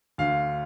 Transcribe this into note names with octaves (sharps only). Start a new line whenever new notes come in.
D2 D3 F5